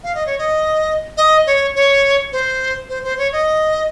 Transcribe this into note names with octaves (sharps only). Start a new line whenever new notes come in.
F5
D#5
C#5
D#5
D#5
C#5
C#5
C5
C5
C5
C#5
D#5